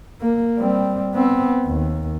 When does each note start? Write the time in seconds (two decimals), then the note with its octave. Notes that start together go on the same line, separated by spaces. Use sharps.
0.21 A#3
0.58 G3 C4
1.14 B3 C4
1.66 D#2